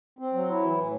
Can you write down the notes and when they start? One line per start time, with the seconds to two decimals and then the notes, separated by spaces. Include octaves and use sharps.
0.19 C4
0.34 F#3
0.49 E4
0.63 E3
0.78 A2